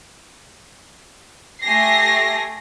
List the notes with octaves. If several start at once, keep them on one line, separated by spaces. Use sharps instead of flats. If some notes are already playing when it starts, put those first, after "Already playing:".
A3 G4 G#5 A#6 C7